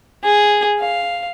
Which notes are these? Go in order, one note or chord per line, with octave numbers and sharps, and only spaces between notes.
G#4
F5